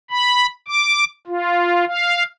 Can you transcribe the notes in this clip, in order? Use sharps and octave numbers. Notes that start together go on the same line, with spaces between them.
B5
D6
F4
F5